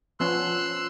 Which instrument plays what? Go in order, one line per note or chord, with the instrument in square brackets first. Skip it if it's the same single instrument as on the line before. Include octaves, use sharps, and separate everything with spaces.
[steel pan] F3 B3 C#4 [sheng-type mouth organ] C6 E6 F#6